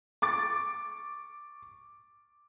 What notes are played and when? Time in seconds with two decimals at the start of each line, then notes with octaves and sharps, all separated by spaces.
0.22 C#6 D6 A6